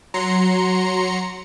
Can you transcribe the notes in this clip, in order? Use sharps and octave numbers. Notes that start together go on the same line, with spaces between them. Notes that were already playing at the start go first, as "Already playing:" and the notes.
F#3 A#5 C6 C#7